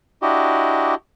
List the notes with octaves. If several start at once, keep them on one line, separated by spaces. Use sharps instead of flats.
D4 E4 F#4 G4 D#5